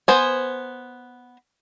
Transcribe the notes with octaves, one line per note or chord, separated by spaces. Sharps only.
B3 C5 G#5